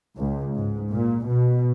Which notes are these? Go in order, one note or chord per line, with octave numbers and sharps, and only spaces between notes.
C#2
G#2
A#2
B2